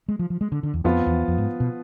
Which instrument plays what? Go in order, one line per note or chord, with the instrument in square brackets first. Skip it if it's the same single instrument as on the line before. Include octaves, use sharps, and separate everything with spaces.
[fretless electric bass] G#3
F3
F3
G#3
D3
D3
E2
[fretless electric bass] F2 [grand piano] F3 B3 F4
[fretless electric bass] E2
F2
G#2
B2